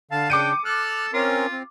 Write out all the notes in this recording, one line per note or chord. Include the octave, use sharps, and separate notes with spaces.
D3 F5 A5
C#3 D4 G5 D6 C#7 D#7
A4 F6 F#6
C4 C#4 F4 A#4
C4